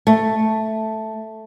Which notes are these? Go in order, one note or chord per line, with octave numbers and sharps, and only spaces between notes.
A3